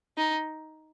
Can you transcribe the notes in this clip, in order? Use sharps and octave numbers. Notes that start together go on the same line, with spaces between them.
D#4